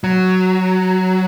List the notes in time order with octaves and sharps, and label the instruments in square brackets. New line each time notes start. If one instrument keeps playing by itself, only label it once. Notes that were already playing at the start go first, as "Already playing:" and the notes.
[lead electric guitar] F#3